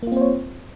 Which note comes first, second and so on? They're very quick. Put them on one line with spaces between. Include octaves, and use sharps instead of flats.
A#3 F4 C4 C5 C#5